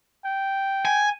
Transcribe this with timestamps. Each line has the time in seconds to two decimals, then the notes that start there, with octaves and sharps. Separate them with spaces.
0.25 G5
0.85 G#5